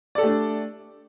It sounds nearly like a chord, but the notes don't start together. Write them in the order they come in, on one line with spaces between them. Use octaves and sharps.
D5 A4 G4 A3 D4